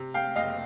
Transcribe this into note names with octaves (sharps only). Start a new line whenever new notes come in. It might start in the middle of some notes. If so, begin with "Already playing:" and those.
Already playing: C3
F5 G5
F#1 D#5 F5